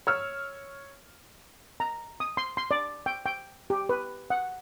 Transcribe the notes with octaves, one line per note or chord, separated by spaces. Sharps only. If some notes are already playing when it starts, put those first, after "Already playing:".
C#5 E6 F6
A#5
D#6
C6
C6
D5
G5
G5
G4
B4
F#5